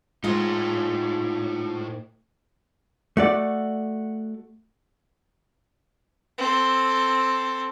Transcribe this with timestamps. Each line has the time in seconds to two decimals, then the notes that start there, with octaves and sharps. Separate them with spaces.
0.24 A2 G#3 D#4 F4 C5 F#5
3.17 A3 F#4 D5
6.38 C4 A4